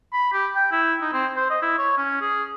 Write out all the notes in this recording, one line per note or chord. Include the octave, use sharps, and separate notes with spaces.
B5
G4
G5
E4
D#4
C4
C5
D#5
E4
C#5
C#4
G#4